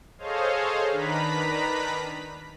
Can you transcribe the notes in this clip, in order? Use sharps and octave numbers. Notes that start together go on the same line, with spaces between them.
G#4 A4 C5 C#5 D#5 F5
D#3 D4 B4 A#5 B5 B6